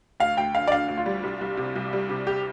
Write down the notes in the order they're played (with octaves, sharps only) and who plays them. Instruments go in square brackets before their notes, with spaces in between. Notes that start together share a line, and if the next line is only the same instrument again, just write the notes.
[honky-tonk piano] D2 [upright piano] F5
[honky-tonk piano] D2 [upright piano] G5
[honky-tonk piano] D3 [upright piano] F5
[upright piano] D5
[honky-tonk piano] D4 [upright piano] F5
[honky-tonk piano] D2
[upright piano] F4
[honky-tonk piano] G3
C2
C2
C3
C2
G3
C3
[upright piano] G4